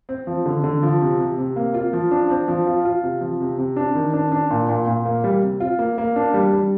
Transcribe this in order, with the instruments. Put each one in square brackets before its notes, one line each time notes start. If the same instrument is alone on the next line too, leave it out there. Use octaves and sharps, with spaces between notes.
[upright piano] C4
F3
D3
D3
F3
C3
C3
C3
A#3
F4
F3
D4
C4
F3
F4
F4
C3
F3
C3
C3
D4
D#3
D4
D4
A#2
A#2
A#2
A#3
G3
C3
F4
A#3
A#3
D4
G3
G3